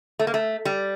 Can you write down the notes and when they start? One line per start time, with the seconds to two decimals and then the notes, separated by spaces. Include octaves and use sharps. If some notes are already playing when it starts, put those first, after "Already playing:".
0.19 A3
0.27 A#3
0.34 A3
0.65 G3